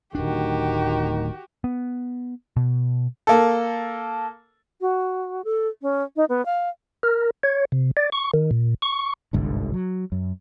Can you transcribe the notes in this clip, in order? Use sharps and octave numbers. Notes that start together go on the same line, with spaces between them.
D1 D2 D#3 D4 F#4 G4
B3
B2
A#3 A4
F#4
A4
C#4
D#4
B3
F5
A#4
C#5
C3
D5
C#6
D#3
A#2
C#6
G1 C2 G#2 D3
F#3
F#2